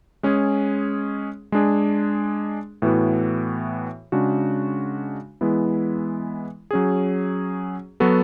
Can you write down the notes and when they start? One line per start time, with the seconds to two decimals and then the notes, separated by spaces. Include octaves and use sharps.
0.23 G#3 C#4 G#4
1.52 G#3 D4 G#4
2.82 A2 E3 B3 F#4
4.12 C#3 G#3 D4 F#4
5.41 E3 G#3 B3 E4
6.71 F#3 C#4 G#4
8.00 F#3 B3 F#4 A4